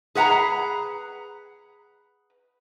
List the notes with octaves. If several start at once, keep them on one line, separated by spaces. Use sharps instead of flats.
G#4 B4 F#5 G#5 A#5